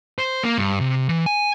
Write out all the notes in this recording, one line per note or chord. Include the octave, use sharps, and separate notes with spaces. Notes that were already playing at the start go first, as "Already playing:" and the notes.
C5
A#3
G2
C3
E3
G#5